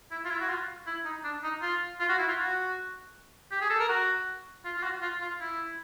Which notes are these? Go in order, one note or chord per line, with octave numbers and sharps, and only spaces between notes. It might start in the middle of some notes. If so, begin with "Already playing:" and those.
E4
F4
E4
F#4
F4
E4
D#4
D4
D#4
F4
F4
F#4
E4
F4
F#4
G4
G#4
A4
A#4
F#4
F4
F4
F#4
F4
F4
E4